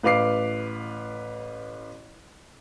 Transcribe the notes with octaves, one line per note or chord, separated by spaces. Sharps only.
A1 B4 F5 D6 C7